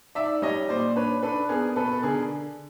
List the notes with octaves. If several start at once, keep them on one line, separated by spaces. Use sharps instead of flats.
D#4 D5 E5
G3 C#5 D#5
A#2 C5 D5
D4 B4 C#5
D4 A4 B4
B3 G#4 A#4
B2 A4 B4
A4
D3 G#4 A#4